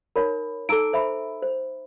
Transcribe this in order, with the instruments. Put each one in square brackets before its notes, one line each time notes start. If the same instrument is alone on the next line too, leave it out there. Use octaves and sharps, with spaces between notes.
[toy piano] D#4 C#5 B5 [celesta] A#4
[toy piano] D#4 A#5 E6 [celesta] A4 D7
[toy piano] C5 E5 B5
C5